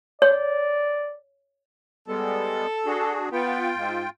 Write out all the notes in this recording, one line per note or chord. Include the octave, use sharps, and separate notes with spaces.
C#5 D5
G3 G#3 B3 A4
D4 F#4 G#4
B3 F4 G5
G#2